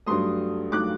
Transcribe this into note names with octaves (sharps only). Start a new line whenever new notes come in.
G2 F#3 A3 C6 D#6
F#3 A3 D6 F#6